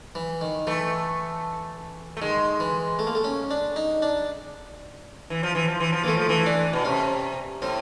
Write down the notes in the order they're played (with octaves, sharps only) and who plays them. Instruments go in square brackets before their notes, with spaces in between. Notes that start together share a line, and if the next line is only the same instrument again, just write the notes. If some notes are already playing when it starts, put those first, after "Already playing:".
[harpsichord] E3
D#3
[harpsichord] E3 [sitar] A3
[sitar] A3
[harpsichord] D#3 [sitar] G#3
[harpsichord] E3
A3
A#3
A3
C#4
D4
D#4
D4
[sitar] E3
F3
E3
F3
E3
F3
[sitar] E3 [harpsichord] A3 A#3
[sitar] F3
E3
[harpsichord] D4
[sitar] B2
[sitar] C3 [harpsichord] C#4
[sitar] A2 [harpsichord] C4